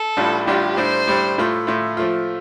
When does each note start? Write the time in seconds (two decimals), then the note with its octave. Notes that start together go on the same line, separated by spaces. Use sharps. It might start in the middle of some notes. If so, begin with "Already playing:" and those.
Already playing: A4
0.17 A1 A2 G3 D4 F4
0.47 A1 A2 G3 D4 F4 G4
0.77 A2 G3 D4 C5
1.07 A2 G3 D4
1.38 A2 A3 F4
1.67 A2 A3 F4
1.97 F3 A3 F4